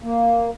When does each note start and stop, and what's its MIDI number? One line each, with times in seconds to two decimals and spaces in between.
0.03 0.50 58